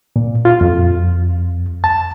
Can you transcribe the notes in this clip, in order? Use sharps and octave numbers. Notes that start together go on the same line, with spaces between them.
A#2
F4
F2
A5